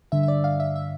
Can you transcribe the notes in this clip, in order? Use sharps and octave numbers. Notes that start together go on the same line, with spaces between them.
G2 D3 E5
E5
D5
F5
E5
E5